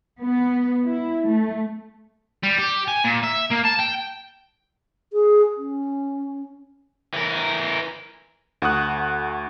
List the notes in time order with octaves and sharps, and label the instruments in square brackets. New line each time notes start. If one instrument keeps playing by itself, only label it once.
[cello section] B3
E4
A3
[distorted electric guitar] G3
G4
G#5
A#2
E5
A#3
A5
G5
[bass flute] G#4
C#4
[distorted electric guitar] E3 A#4
[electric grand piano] D2 F#5 C#6 D#6 F#6